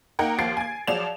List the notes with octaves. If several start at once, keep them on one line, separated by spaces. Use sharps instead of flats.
A#3 D#4 A#4 F#5 G5
D#2 F3 A6 C7 D7
G#5 G#6
F3 F#3 G#4 D5 E7 F7